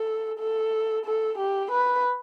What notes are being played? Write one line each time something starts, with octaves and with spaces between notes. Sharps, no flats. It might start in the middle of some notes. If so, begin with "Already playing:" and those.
Already playing: A4
A4
A4
G4
B4